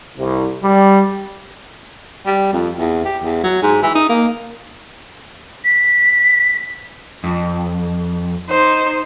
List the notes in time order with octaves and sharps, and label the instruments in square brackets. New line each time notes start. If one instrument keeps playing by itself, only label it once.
[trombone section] C2
G3
[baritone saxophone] G3
F2
E2
G4
E2
F#3
G#2
E3
D#4
A#3
[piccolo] B6
[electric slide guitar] F2
[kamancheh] D#4 C5